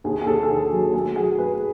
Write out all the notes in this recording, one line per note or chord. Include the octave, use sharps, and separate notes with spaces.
D#2 G#4
G#4
D#2 A4
A4
D#3 G#4
F#3
A3 G#4
F#3 G#4
A3 B4